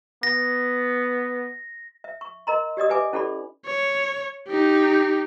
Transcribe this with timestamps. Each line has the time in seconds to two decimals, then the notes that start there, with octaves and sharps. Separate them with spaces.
0.23 B3 A#6
2.04 E5
2.21 C#6
2.47 A#4 D#5 A#5 C6
2.77 G4 D5 D#5 D#6
2.89 G4 B4 E5 G#5 D6
3.13 C#4 E4 G4 A4 D5 B5
3.66 C#5
4.47 D#4 G4